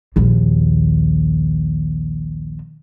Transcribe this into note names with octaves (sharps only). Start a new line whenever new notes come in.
A#1 D#2